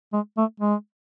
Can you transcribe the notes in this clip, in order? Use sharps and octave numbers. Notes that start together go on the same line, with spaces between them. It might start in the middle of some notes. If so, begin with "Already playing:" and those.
G#3
A3
G#3